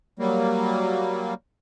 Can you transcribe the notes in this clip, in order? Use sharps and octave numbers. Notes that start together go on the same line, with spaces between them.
F#3 G3 A#3